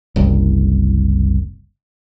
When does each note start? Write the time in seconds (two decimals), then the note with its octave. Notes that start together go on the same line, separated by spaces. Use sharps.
0.16 F#1 C2